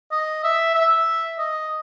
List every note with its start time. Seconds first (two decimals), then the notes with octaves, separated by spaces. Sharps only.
0.12 D#5
0.44 E5
0.75 E5
1.39 D#5